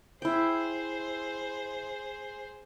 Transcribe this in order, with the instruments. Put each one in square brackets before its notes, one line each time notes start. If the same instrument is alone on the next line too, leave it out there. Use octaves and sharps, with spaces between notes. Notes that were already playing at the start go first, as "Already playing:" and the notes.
[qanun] E4 G5 [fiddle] G#4 C5